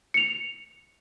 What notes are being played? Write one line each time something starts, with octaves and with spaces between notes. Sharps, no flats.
C#7 F7